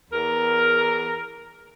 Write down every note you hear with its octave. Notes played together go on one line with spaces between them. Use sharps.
E2 A#4